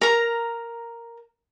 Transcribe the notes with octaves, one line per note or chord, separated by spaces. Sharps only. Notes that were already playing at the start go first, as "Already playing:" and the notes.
A#4 A#5